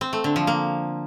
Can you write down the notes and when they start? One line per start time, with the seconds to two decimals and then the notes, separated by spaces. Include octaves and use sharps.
0.01 C4
0.13 A3
0.24 D3
0.36 F3
0.47 A#3